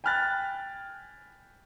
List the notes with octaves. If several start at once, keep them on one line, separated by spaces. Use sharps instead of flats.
G5 G#5 B5 F6 F#6 A6